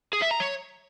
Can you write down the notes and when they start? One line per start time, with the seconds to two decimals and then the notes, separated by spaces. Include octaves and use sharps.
0.13 G#4
0.22 E5
0.31 A#5
0.40 C#5